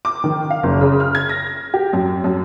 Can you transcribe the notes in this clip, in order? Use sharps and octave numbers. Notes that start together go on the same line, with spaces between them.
D6
D#3
F5
F#1
C#3
F6
G#6
A#6
G4
F#2
F#2